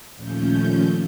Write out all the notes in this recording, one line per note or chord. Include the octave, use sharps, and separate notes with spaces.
D#2 A#2 F3 A3 C#4 G6